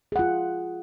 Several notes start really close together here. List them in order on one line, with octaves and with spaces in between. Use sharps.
G#4 F#5 F4